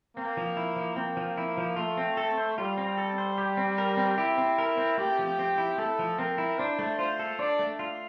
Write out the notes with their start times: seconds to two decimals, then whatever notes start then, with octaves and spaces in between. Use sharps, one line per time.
0.16 A#3 C4
0.37 F3
0.57 E4
0.76 F3
0.96 A#3 C4
1.17 F3
1.37 E4
1.58 F3
1.76 A3 F4
1.97 C4
2.17 A4
2.38 C5
2.58 G3 F4
2.77 C4
2.98 A4
3.18 C5
3.38 G4
3.57 C4
3.78 A#4
3.97 C4
4.18 E4 G4
4.38 C4
4.58 A#4
4.78 C4
4.98 A3 G4
5.19 F3
5.39 C4
5.58 E4
5.78 A3 A4
5.99 F3
6.19 C4 A#4
6.38 E4
6.58 D4 C5
6.79 A3
6.99 F4 C5
7.19 A4
7.39 D4 D5
7.59 A3
7.79 F4